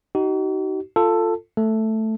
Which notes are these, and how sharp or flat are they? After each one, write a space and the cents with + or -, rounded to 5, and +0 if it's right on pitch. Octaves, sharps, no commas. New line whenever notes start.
D#4 +5 F#4 +45
F4 +0 A4 +10
A3 +0 A4 +0